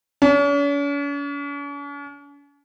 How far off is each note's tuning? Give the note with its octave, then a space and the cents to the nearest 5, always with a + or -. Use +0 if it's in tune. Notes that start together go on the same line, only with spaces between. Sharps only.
C#4 +45